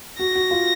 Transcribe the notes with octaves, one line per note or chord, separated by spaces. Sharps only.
F#4 A#6
F#4
F4